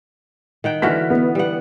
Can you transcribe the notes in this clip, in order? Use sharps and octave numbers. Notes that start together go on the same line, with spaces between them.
D#3 F#5 G5
D3 E3 F#4 F6 B6
B3
G3 F#5